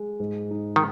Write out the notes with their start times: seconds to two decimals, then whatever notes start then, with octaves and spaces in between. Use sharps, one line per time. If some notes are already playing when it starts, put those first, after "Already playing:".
Already playing: G#3
0.20 G#2
0.51 D#4
0.76 D#3